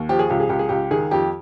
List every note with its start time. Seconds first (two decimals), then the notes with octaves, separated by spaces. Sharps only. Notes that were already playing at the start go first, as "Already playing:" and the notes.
Already playing: D#2
0.09 F3 G4
0.19 G#4
0.30 C#2 G4
0.40 G#4
0.49 C#2 G4
0.59 G#4
0.69 C#2 G4
0.91 D#3 G#4
1.11 F2 G4